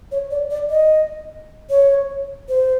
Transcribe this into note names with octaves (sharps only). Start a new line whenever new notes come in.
C#5
D5
D5
D#5
C#5
C5